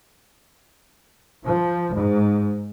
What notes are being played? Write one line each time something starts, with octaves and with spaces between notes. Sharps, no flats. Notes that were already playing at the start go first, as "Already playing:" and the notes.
F3
G#2